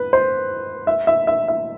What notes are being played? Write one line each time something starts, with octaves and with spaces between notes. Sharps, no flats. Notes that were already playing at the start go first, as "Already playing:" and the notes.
Already playing: B4
C5
E5
E5
E5
E5